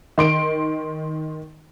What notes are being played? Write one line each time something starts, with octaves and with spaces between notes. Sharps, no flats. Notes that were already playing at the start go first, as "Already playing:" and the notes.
D#3 C6 D7